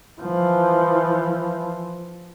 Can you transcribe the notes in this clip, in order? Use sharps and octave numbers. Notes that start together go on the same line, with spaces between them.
E3 F3